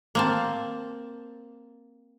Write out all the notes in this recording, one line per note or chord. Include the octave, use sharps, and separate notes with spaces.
A#3 C4 A5